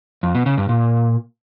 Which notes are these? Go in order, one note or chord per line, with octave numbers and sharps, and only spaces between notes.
F2
B2
C#3
G2
A#2